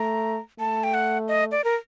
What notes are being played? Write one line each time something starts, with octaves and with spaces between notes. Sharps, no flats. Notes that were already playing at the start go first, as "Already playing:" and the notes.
Already playing: A3 A#5
A3 A5
G5
F#5
D#5
D5
A#4